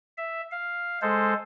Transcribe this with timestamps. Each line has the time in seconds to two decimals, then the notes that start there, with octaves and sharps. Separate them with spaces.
0.18 E5
0.51 F5
1.02 G#3 A4 C5